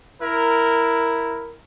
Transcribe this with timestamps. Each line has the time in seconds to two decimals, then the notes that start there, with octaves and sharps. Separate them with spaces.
0.22 E4 A#4